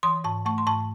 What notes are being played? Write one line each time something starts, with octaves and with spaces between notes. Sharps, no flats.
E3 C6 D#6
G#2 A5 C#6
A3 A5 C#6
C6
G#2 A5 C#6